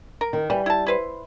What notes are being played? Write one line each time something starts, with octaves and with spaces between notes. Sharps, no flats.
A#4
D#3
E3 G3
E4 A5
E4 B4 C5